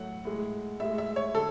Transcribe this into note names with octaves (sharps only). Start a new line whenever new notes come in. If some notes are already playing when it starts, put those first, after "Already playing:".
Already playing: A2 F#3 A3 F#5
A2 G#3
A2 G#3 E5
E5
C#5
D3 A4